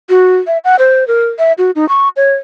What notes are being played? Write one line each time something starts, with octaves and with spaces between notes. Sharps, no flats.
F#4
E5
F#5
C5
A#4
E5
F#4
D#4
C#6
C#5